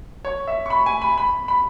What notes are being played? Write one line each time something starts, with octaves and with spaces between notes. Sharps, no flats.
C#5
E5
C#6
B5
G#5
B5
B5
B5